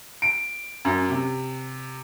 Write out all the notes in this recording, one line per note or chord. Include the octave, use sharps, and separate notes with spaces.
D7
F#2
C3